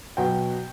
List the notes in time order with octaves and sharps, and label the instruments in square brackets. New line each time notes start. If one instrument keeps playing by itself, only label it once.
[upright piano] B2 F#3 G5